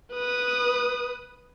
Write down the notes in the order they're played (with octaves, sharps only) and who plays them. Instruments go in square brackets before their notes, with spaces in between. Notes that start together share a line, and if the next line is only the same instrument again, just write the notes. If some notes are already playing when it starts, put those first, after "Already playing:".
[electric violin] B4 D#6